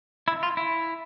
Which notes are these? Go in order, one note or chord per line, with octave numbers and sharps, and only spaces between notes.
E4
F4
E4